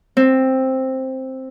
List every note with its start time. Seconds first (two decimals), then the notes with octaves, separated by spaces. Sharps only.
0.17 C4